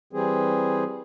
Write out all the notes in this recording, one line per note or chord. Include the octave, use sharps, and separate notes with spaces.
E3 G3 C4 G#4